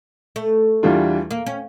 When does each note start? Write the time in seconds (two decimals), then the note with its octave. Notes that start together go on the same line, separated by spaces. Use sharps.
0.36 A3
0.83 E2 E3 G3 D4 F4
1.31 A#3
1.46 C#4